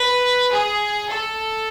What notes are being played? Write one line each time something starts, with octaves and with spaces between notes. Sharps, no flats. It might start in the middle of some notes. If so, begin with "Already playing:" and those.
Already playing: B4
G#4
A4